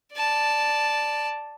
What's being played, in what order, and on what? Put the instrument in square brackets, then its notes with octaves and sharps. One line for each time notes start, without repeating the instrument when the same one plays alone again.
[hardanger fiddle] D5 A5